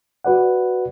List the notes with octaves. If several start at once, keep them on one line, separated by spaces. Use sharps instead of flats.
F#4 B4 D5 F#5